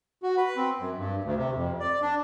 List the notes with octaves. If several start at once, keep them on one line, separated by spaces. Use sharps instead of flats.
F#4
B4
C4
F#2
G2
D2
C3
F2
D5
D4